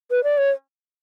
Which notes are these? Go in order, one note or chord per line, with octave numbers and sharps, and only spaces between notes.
B4
D5
C#5